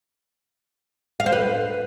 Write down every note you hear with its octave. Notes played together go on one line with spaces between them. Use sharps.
F5
C5
B4